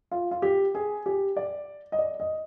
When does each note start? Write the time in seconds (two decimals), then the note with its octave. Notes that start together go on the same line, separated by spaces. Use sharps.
0.11 F4
0.31 F4
0.42 G4
0.75 G#4
1.06 G4
1.37 D5
1.92 D#5
1.99 D5
2.20 D#5